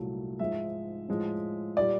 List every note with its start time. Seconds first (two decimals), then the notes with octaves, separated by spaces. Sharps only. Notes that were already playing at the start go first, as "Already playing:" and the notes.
Already playing: C2 A#2 F#3 A3
0.39 G#2 F3 G#3 E5
1.09 A2 F3 G#3
1.77 A#2 G3 D5